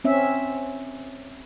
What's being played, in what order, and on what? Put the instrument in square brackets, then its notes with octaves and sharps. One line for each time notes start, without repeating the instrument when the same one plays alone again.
[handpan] C4 C#4 E5